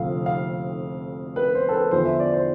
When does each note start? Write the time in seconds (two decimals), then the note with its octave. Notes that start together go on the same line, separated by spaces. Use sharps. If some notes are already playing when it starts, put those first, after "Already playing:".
Already playing: F1 F2 D3 F3 F5
0.26 F5
1.36 B4
1.55 C5
1.69 A4
1.73 B4
1.91 E2 D3 F3 C5
2.05 E5
2.20 D5
2.34 C5